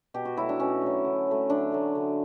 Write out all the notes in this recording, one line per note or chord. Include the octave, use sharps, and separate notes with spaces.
B2 G4
F#4
F#3 A3 E4
D4
B2 C#4
F#3 A3
D3
F#3 A3
D3 D4
F#3 A3
D3